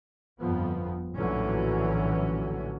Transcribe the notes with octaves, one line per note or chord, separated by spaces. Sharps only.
G1 F2 F3 B3
A#1 A2 D3 E3 F#3 C#4